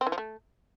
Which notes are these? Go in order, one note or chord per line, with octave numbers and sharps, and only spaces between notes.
C4
E3
F3
A3